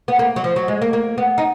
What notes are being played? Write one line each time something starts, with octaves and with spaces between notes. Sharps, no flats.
B3
A#3
F#3
F3
F#3
G#3
A#3
A#3
B3
D#4